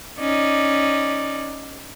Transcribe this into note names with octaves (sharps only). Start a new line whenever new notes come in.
C#4 D#4 D5